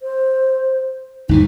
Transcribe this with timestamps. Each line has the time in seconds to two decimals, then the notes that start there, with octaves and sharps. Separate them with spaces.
0.01 C5
1.29 D2 G2 E3 D#4